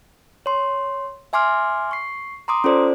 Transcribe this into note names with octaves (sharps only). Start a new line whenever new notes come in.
C#5 C6
E5 G#5 C6 D6 F6
C#6 C7
A#5 C6 D6 D#6
C#4 F4 A4 C5 D5